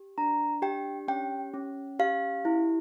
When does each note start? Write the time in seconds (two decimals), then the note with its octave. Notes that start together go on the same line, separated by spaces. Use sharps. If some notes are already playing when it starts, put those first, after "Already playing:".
Already playing: G4
0.18 D4 A#5
0.62 G4 G5
1.08 C#4 G5
1.54 C#4
1.99 G4 F5
2.45 E4